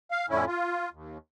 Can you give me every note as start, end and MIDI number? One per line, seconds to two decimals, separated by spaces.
0.11 0.26 77
0.30 0.45 41
0.30 0.45 45
0.30 0.45 50
0.30 0.45 61
0.30 0.45 64
0.47 0.89 65
0.93 1.18 39